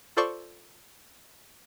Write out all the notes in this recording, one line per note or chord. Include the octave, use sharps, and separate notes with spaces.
F4 A4 C5 D5 C6 C#6